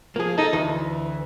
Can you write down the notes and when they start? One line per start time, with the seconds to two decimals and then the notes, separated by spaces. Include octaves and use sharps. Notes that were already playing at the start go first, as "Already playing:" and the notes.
0.16 F3 A#3 G#4
0.38 D#4 A4
0.53 D2 E3